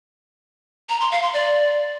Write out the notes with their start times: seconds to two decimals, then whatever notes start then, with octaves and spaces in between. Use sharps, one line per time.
0.89 A#5
1.00 C6
1.12 F5
1.23 C6
1.34 D5